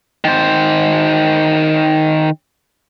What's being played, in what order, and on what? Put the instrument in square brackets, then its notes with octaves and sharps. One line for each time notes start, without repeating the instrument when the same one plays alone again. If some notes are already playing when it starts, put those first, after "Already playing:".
[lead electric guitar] D#3 C5